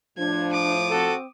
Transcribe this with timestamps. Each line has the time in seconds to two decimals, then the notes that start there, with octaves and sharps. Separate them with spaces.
0.18 A2 F3 D4 G#6
0.53 D6 D#6
0.91 C4 F#4 A4